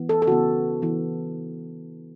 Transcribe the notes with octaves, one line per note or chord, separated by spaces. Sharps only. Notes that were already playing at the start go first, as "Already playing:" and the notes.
Already playing: E3 B3
A4
A4
C#3 E3 B3 F#4
E3 B3